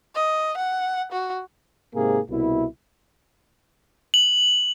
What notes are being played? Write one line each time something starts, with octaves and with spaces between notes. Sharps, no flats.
D#5
F#5
F#4
G#2 C3 A#3 G#4
C2 B2 E4
F#7